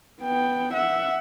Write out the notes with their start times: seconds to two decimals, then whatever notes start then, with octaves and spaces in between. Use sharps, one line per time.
0.22 B3 G5
0.74 E5 F#5